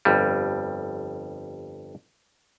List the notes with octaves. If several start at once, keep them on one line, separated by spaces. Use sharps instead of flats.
G1 F2 G3